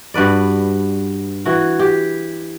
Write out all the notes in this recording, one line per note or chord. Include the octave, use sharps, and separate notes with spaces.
G2 F#4 B4 D5
E3 F#4
G4